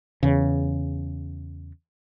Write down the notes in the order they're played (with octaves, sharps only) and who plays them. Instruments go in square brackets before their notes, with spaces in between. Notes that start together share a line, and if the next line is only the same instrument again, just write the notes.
[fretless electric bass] E2 C#3